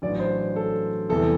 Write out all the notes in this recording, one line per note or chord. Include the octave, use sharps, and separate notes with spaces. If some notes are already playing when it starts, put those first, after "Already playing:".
A1 G2 F#3 D5
C5
A4
E2 C3 E3 G3 A4